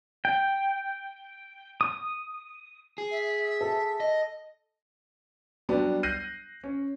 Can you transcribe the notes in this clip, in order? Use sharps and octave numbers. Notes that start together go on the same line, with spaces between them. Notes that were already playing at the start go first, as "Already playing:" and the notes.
G5
D#6
G#4
E5
A4
D#5
F#3 G3 B3 D4
F#6 G6 A#6 C7 D#7
C#4